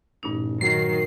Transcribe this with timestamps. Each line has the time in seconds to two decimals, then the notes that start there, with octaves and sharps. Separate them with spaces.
0.23 A1 G2 A#2 D#4
0.61 D#3 F#3 C7